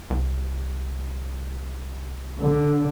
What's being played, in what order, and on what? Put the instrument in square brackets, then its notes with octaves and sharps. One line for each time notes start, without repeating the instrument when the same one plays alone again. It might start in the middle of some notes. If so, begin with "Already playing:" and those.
[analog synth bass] C2
[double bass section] D3